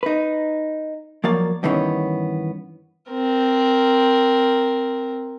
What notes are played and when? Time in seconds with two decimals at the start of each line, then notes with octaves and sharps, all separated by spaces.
0.03 D#4 B4
1.24 F3 F#3 A#3 D5
1.63 G2 D#3 E3 A3 B3 C#4
3.11 C4 A#4